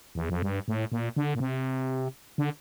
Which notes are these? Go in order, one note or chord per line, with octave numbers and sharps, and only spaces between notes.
E2
F2
G2
A2
A#2
D3
A#2
C3
D3